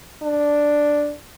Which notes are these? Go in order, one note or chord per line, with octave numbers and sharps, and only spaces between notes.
D4